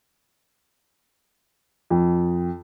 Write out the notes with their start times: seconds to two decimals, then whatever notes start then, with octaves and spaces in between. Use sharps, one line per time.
1.90 F2